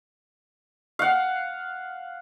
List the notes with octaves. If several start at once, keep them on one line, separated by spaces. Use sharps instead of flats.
F5 F#5